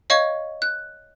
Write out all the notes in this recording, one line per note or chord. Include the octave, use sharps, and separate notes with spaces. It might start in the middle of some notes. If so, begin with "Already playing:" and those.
C#5 D#5 F5 C#6 G#6
F#6